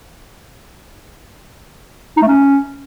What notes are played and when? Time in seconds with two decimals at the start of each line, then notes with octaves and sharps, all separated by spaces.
2.17 D#4
2.22 A3
2.27 C#4